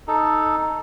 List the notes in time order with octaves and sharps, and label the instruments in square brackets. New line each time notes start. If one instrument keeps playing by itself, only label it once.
[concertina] D#4 A4